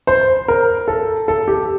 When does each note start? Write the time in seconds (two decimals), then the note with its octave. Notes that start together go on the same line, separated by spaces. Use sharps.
0.07 C5
0.48 A#4
0.88 A4
1.28 A4
1.48 G4